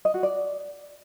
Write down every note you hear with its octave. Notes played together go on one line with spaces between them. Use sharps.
D#5
F#4
D5